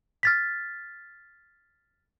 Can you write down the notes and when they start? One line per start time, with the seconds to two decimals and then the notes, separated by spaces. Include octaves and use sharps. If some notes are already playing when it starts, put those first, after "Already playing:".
0.23 F6 A6 B6